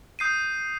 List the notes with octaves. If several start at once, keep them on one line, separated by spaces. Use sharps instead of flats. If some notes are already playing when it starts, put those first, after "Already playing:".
D#6 G6 C7 D#7